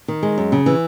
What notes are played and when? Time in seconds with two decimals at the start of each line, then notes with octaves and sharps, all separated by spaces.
0.08 D#3
0.23 G#3
0.38 F#2
0.52 C#3
0.66 E3